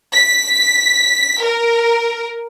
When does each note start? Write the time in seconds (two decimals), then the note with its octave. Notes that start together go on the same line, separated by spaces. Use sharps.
0.14 B6
1.43 A#4